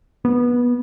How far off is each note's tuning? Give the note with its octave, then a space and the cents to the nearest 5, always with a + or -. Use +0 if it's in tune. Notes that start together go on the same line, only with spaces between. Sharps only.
B3 -20